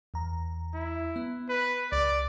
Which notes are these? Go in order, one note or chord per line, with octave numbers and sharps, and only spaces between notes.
E2 A#5
E4
B3
B4
C#2 D5